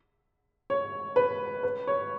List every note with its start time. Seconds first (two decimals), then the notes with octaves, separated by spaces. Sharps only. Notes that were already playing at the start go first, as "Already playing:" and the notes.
0.70 C#5
1.16 B4
1.63 B4
1.87 C#5